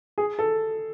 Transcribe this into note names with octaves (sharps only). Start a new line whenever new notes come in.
G#4
A4